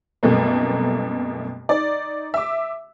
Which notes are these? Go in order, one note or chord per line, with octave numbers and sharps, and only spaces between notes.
C2 F#2 B2 A3 A#3
D#4 D5
E5 D6